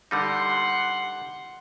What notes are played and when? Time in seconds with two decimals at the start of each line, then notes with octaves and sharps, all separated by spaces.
0.11 D3 G3 D#4 F#5 C6